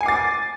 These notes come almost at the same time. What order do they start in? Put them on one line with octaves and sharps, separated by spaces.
G#5 C7 D6 A6